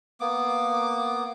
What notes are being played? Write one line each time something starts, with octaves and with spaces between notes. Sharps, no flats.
A#3 B3 D6